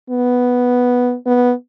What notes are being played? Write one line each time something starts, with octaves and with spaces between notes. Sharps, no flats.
B3
B3